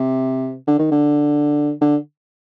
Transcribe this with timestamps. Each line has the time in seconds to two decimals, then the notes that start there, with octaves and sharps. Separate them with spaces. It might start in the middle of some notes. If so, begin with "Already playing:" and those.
Already playing: C3
0.67 D3
0.79 D#3
0.91 D3
1.81 D3